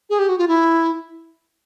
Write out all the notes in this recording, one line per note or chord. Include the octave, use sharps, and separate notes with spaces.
G#4
G4
F#4
F4
E4